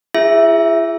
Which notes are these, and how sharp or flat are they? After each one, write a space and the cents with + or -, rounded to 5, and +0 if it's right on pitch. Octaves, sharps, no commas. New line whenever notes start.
E4 +45 G#4 -15 E5 +0